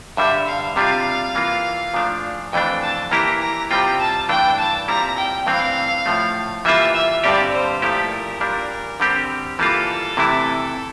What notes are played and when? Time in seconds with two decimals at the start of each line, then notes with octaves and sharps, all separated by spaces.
0.17 G2 D3 G3 E5
0.47 F5
0.76 C3 G3 D4 F4 F5
1.35 E3 A#3 F4
1.94 A#2 F3 A3 D4
2.52 F2 E3 A3 D4 G5
2.81 A5
3.11 E3 A#3 E4 G4 A#5
3.41 A#5
3.70 C3 G3 C4 F4 G5
3.99 A5
4.29 G2 E3 A3 D4 G5
4.58 A5
4.88 A#2 G3 C4 E4 A#5
5.17 G5
5.47 G2 E3 A3 C4 F5
6.06 A2 F3 A3
6.65 E3 G3 A#3 F4 E5
6.94 E5
7.24 G2 D3 G3 C4 G4 D5
7.53 C5
7.82 A#2 F3 A3 E4 G4 A4
8.11 A#4
8.41 A#2 G3 D4
9.00 D3 G3 C4 G4
9.58 E3 G3 A#3 F4 A4
10.17 C3 E3 A3 E4